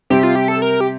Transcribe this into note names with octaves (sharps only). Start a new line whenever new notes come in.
C3 G3 C4 G4
F4
G4
A4
A#4
G4